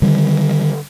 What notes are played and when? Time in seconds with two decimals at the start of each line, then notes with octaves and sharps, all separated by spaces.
0.02 D3 D#3 G3